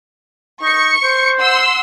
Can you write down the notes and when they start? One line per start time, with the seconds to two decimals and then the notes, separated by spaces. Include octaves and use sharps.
0.62 D#4 C#6 C#7
1.03 C5
1.40 F#5 C6 E6